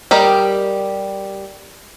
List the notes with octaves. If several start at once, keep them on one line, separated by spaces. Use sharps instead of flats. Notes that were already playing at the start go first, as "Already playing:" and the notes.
G3 G4 A#4 D#5